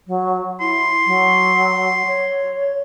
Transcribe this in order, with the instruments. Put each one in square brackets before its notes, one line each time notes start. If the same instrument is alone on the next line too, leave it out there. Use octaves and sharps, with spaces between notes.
[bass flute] F#3
[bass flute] E4 [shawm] C6
[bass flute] F#3
C#5